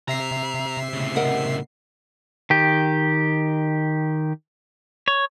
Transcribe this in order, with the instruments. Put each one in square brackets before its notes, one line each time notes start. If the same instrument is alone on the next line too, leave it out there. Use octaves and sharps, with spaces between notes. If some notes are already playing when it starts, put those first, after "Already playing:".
[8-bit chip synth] C3 E5 C7 [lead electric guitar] A#5
[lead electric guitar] A2 C#3
[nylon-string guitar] A#4 D#5 F#5
[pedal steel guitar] D#3 G4
C#5